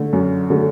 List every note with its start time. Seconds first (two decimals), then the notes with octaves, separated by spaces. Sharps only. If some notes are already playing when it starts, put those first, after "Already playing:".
Already playing: D3 A3
0.13 F#2
0.50 D3 A3